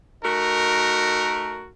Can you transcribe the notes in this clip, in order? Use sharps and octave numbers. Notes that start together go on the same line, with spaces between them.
A3 D#4 F#4 A#4